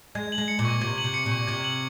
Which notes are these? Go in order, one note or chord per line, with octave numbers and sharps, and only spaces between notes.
G#3 G#6
F#7
G#3
C#7
A#2
C#6
C3 G#6
F#7
C3
C#7
A#2
C#6
C3 G#6
F#7